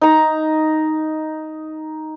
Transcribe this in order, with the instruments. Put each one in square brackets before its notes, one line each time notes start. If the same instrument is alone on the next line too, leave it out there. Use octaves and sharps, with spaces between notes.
[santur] D#4 A#5